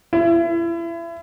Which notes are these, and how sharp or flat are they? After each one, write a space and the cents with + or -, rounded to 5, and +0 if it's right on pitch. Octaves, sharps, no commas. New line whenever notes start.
E4 +35